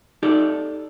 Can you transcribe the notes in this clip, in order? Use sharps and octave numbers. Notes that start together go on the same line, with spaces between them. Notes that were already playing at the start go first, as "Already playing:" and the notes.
D#4 G4 A4 D5